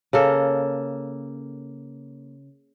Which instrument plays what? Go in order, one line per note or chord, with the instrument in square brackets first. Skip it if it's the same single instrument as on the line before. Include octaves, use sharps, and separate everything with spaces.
[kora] C#3 A#3 A4